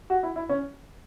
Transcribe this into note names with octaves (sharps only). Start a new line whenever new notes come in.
F#4
E4
E4
C#4